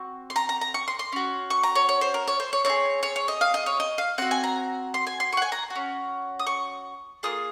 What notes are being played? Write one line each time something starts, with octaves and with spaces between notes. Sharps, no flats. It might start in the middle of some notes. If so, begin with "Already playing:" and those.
Already playing: C4 F#4 C#6
C6
A#5
A#5
A#5
C#6
C6
C6
C#4 F#4
C#6
A#5
C#5
C#5
C5
A#4
C#5
C5
C#5
C4 D#4 G#4 C#5
C#5
C#5
D#5
F5
D#5
C#5
D#5
F5
C4 F#4 F#5
G#5
A#5
C6
G#5
C6
C#6
F#5
G#5
A#5
F#4
C#4
D#6
C#6
A#3 F4 G#4 D#6